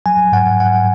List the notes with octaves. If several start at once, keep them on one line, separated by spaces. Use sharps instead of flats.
F#3 G#5
G#2 F#5
G#2 F#5